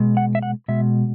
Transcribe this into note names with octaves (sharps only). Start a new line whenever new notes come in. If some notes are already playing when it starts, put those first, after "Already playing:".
Already playing: B2 G#3
F#5
E5
F#5
B2 G#3 E5